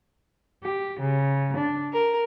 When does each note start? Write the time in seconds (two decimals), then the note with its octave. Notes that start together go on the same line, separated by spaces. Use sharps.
0.64 G4
1.00 C#3
1.57 D4
1.92 A#4